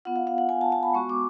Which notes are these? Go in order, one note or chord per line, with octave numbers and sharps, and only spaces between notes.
B3 F4 F#5
F5
F5
F#5
G#5
A5
A5
B5
G#3 B3 F#4 C#6
D6